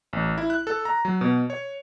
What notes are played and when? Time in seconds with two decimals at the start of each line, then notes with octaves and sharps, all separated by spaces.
0.13 A1
0.38 E4
0.50 F#6
0.67 A4
0.85 A#5
1.05 F#3
1.21 B2
1.50 C#5